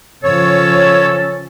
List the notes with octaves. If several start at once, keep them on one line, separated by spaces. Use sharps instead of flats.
C#3 F3 C#4 A4 C#5